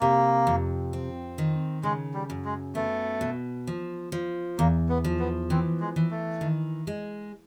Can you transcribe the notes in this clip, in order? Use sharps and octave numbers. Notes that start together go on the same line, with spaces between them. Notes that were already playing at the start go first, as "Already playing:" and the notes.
C3 A#3
F2
C4
D#3
C#3 G#3
G3
F#2
G#3
A3 B3
B2
F3
F3
E2 A#3
B3
F3
B3
E3 C4
G#3
E3
A3
D#3
G#3